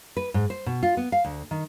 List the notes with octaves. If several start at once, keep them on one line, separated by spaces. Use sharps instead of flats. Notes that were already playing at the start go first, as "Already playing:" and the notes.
B4
G#2
C5
B2
F4
B3
F5
D2
D#3